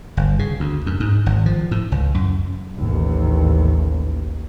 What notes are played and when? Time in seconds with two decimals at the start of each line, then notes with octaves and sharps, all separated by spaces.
0.17 G1
0.39 C#3
0.60 D2
0.86 F#2
1.00 G#2
1.26 G#1
1.46 F3
1.71 A2
1.92 C#2
2.14 F#2
2.78 A1 D#2